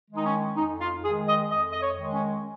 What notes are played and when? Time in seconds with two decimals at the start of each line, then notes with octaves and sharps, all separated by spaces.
0.10 D#3 G#3
0.16 D#4
0.25 C#4
0.56 F2 D#4
0.80 F4
1.04 D#3 G#3 G#4
1.27 D#5
1.50 F2 D#5
1.72 D#5
1.81 C#5
1.96 D#3 G#3
2.13 C#4